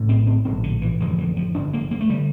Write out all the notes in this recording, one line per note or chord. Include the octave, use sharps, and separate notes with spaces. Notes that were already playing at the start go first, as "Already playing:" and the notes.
Already playing: A#1 A2
C4
C4
A#1 A2 C4
D3
E3
G1 F2 D3 E3
E3
F3
G1 F2 D3 D4
A#3
A#3
A3
D3 G3